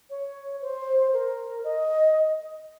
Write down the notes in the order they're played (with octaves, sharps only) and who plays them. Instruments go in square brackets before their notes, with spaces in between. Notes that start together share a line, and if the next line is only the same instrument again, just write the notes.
[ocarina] C#5
C5
A#4
D#5